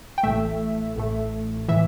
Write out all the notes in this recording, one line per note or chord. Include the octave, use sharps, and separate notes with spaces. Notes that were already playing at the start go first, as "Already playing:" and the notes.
G5
A1 A2 A3 E5
A1 A2 A3
A2 E3 E5